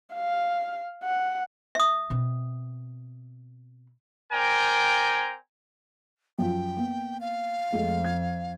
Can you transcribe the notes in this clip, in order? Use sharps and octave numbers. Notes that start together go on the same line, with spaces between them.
F5
F#5
E5 D#6
B2 C4
C4 A#4 D5 G5 G#5 A#5
F#2 F3 G5
A#3 B3
F5
F2 G#3 A3
G#6